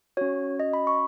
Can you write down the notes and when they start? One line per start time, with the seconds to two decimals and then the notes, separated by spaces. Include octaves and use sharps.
0.17 C#4 F#4 C#5
0.60 D#5
0.73 B5
0.87 C#6